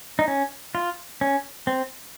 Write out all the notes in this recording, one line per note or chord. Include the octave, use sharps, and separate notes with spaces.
D#4
C#4
F4
C#4
C4